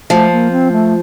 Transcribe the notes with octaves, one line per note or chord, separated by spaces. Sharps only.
F3 A3
A#3
C4
A3